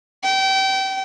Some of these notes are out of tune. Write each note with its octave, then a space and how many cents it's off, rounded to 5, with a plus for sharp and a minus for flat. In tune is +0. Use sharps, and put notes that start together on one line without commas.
G5 -30